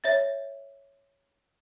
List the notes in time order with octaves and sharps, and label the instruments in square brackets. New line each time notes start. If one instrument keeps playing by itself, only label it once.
[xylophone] C#5 E5 A6